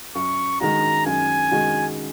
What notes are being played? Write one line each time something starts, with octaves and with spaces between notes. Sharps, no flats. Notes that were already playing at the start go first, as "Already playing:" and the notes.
F#2 C#6
D#3 G#3 F#4 A#5
F#2 G#5
D#3 G#3 F#4